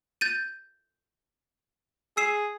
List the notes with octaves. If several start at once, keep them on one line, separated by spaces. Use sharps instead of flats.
G6 A6 D#7
G#4 E6 C7 E7